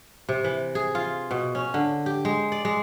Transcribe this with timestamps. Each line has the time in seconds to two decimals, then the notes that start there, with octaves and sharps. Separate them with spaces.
0.29 C3
0.44 E3
0.75 G#4
0.95 F4
1.31 B2
1.55 C#4
1.74 D3
2.06 G4
2.25 G#3
2.52 D5
2.65 G#3